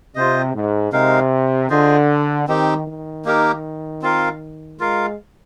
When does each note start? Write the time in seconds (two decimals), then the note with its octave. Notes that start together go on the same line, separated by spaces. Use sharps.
0.15 C3 F4 C5 D#5
0.55 G#2
0.92 C3 G#3 D#4 A#4 F5
1.70 D3 F4 G#4 C5 D#5
2.47 D#3 C4 D#4 G4
2.87 D#3
3.25 A#3 D#4 G4 A#4
4.02 C4 F4 A#4 F5
4.79 G#3 F4 A#4 F5